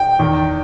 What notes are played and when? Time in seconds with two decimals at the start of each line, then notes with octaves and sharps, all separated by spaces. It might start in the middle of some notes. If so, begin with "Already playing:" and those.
Already playing: G5
0.19 E2 D#3